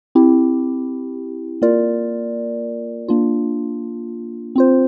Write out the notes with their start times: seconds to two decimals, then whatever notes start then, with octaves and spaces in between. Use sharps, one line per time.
0.15 C4 E4 G4
1.62 A#3 F4 A#4 D5
3.08 A#3 D4 F4
4.56 C4 F4 C5